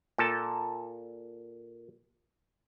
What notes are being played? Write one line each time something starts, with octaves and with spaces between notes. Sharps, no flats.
A#2 A4 A5